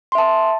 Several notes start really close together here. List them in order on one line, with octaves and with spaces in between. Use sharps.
C6 E5 A5